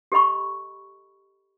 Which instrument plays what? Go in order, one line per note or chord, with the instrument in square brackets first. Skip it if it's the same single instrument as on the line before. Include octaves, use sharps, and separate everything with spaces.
[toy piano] G4 A4 D#5 B5 C#6